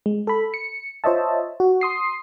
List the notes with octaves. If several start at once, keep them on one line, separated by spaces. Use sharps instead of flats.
G#3
A4 B5
C#7
F4 C5 C#5 D#5 E5 A5
F#4
C6 D#6 C7